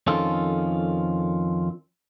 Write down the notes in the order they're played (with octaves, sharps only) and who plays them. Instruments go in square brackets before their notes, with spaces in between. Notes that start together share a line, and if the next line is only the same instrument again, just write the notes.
[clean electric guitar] F2 D#3 F3 C#4 F4 A4